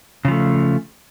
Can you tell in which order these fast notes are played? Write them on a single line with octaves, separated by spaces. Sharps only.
C#3 F3 A3